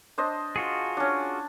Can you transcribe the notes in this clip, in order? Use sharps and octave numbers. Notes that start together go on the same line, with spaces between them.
D4 C5 D#5
F4 F#4 G#4
C#4 D4